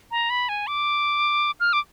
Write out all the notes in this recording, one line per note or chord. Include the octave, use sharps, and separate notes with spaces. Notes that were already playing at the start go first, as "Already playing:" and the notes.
A#5
B5
G#5
D6
F6
D6